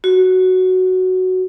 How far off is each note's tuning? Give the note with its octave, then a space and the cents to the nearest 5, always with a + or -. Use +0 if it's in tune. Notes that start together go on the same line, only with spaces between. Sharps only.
F#4 +5